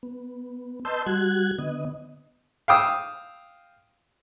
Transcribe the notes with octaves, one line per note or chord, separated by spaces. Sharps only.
B3
B4 D#5 A5 C6 E6 G6
G3 F#4 F#6 G#6
D3 B3 D#5
F5 G5 D#6 E6